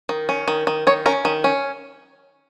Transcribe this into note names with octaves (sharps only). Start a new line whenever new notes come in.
D#3
C#4
D#3
D#3
D#3 C#5
C#4 A#4
D#3
C#4